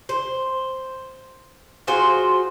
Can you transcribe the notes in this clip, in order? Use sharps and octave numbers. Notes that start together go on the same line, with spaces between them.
C5
F4 F#4 G#4 C5